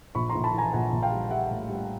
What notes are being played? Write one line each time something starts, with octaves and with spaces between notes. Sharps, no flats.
A#1 B5 C#6
A#5 C6
A#1
A5 B5
E3 G#5 A#5
A#1 F#5 G#5
A#1
F5 G5
G3
G3 E5 F#5
A2
G3